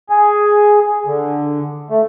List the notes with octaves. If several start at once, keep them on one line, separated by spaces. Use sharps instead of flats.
G#4
D3
A3